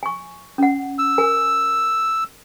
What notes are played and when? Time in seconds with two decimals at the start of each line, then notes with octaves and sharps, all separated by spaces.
0.03 G#5 C#6
0.58 C#4 F#5
0.99 E6
1.18 A#4 G#5